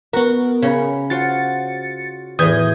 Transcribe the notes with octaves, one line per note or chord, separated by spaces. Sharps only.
B3 F#4 A#4
C#3 C#5 A#5 B5
F4 F#4 C5 A6 C#7
E2 A2 D#6 G6 G#6